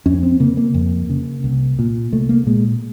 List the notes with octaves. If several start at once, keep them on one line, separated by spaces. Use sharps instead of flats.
F2 C#4
C4
C#3 A#3
A#3
F2
C#3
C2
A#2
C2 A3
A#3
A#2 G#3